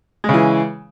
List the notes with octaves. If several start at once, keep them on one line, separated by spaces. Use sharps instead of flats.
C#3 E3 G#3